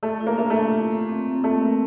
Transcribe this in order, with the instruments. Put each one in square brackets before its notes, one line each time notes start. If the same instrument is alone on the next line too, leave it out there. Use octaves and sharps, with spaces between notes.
[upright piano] A3 [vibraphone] A4
[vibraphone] F4
[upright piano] A#3
[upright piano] A#3 [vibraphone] D4
[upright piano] A3
[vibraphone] F4
G4
A3
C4
C4
[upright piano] A3 [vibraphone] A#3
[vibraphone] A#4